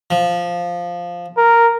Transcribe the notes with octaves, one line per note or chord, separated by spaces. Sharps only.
F3
A#4